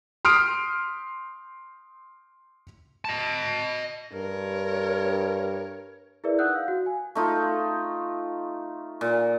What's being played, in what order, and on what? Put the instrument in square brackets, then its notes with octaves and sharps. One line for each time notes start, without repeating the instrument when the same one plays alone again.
[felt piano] C6 D#6 F6 C7 D7
[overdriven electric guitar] D#5 A5
[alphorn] G2 [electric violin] A#4 C#5
[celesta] E4 G#4 A#4 B4 D5 E5
D#4 F#5 D#6 E6 F#6 G6
F5
F#4
G#5
[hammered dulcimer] A3 D#4 F4
A#2